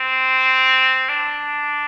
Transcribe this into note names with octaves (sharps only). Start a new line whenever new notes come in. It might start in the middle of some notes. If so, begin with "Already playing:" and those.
Already playing: C4
D4